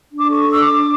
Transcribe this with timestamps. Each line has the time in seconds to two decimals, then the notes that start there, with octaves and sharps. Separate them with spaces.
0.10 D4
0.18 D6
0.29 A4 C#6
0.48 D4 E6
0.59 D6
0.68 D4